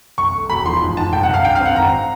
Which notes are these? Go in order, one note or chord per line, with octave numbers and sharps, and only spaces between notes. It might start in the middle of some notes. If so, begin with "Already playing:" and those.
C2 C#6
A3
E1 B5
F3 C6
G#2
G#2 A5
C2 G5
F#5
C2 F5
G2 G5
C4 F5
F#5
G#1 A#5